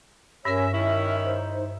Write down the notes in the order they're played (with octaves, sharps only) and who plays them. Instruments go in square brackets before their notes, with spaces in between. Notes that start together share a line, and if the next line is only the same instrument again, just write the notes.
[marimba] G2 A#4 [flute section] C#4 C#5 [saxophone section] E5
[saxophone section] D#3 C#4 E4 [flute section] E5
[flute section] D#4 C5